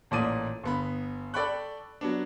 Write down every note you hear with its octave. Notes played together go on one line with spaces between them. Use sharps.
A1 A#2 A3 D5 D#6 D#7
G1 B3 B5
A4 D5 G5 B5 C#6 F#6
F#3 B3 D4